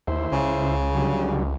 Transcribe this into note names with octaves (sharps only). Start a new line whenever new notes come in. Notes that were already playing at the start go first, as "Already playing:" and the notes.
D#2 E4 C5
C#2 C#3
D3 F#3 G3